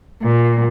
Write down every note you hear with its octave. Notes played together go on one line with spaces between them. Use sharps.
A#2